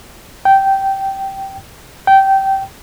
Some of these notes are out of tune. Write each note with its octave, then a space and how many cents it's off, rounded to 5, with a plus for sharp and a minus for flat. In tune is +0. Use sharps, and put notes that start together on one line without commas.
G5 -10
G5 -15